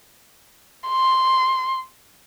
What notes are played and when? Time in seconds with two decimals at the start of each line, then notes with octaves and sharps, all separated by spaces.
0.88 C6